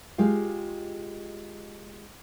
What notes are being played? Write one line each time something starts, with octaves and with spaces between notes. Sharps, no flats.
G#3 F4 G4 F5